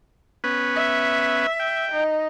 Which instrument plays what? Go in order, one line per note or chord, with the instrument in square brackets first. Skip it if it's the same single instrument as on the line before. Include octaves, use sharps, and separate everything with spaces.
[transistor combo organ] B3 C#4 B4
[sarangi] E5
[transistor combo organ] G5
[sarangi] D#4